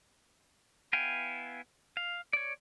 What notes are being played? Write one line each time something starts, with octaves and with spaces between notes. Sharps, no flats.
B3 E4 F5 G5 G#5
F5
C#5 D5